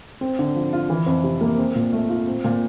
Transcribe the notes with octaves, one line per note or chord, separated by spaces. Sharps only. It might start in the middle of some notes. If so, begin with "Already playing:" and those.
C4
D3
F3
F4
E3
F2
C3
A#3
C4
A#2
A3
F4
C4
A#2